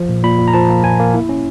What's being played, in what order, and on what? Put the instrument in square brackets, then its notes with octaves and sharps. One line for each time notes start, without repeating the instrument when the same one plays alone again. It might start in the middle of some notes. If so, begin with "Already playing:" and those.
Already playing: [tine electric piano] F3
A#2
A#2 B5
A#2
A#5
F3 A5
A#3
A#2 G#5
A#3
E4
C#4